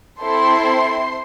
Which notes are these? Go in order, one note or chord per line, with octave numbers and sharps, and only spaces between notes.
C4 E4 A4 C5 C6